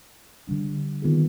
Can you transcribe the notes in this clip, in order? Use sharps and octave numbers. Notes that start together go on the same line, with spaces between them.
D3 G3 D4
D#3 B3 F4 G#4